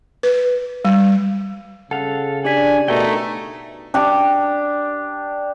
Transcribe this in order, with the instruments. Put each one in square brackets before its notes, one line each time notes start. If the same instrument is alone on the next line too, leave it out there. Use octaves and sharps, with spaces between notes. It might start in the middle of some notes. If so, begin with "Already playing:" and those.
[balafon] B4
G3
[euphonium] C#3 [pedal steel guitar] A4 F5 [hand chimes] F#5
[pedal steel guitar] D4 [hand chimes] G4 D5 B6 [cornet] G#5
[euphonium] B2 [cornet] A3 [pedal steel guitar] D#4 A#4 G5
[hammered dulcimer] D4 G4